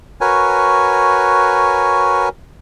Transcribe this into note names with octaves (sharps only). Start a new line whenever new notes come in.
F#4 A#4 B4 C#5 G#5